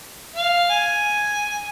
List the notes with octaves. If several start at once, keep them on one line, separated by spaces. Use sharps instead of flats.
F5
G#5